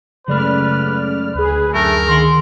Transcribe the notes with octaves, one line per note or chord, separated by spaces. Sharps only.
F#2 C#3 G#3 A3 B4 D5 F6
D2 G#4 B4
F#2 A3 A#4
D#3 F#5 C6